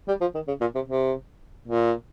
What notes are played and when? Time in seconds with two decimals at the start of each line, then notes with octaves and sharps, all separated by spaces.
0.08 G3
0.21 F3
0.35 D#3
0.47 C#3
0.61 A#2
0.75 C3
0.88 C3
1.68 A#2